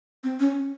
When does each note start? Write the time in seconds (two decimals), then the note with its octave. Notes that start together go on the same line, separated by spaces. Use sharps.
0.24 C4
0.39 C#4